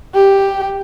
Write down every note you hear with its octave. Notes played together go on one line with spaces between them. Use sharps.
G4